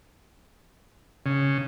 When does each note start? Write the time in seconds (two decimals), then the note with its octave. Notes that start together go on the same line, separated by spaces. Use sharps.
1.26 C#3